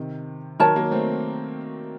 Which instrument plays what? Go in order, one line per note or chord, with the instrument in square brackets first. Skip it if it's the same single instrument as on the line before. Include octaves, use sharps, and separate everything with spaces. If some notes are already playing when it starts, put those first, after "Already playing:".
Already playing: [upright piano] C3 D#3
[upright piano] D#3 F#3 [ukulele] A#4 C#5 A5
[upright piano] F#3 A#3
A3 C4